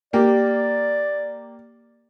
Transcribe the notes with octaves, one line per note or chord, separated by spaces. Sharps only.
A#3 G4 D5